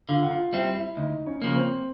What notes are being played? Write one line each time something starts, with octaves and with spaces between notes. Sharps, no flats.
D3 F4 F5
F#5
F4 F5
G3 C4 E4 E5
E4 E5
D2 D#4 D#5
C#4 C#5
C#3 F3 A#3
C4 C5